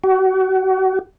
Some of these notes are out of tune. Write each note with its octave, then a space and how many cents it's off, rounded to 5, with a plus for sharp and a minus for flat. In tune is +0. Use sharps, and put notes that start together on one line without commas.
F#4 +35